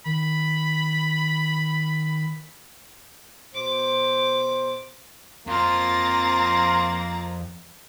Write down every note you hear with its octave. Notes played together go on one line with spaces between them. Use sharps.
D#3 B5
B2 C5 D6
F2 A#3 C4 F4 A#5 A6